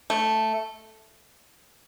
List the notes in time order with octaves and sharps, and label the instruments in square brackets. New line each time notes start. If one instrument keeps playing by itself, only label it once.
[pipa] A3